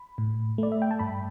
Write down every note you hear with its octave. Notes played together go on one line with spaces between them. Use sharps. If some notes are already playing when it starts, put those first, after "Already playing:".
Already playing: B5
A2
A3 D5
E5
G5
A5
G2 B5